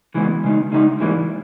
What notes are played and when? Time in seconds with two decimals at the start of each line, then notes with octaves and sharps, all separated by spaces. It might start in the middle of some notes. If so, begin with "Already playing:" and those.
0.14 C#3 E3 G#3 B3
0.44 C#3 G#3 D#4
0.72 C#3 G#3 D#4
1.00 G#2 E3 G3 A#3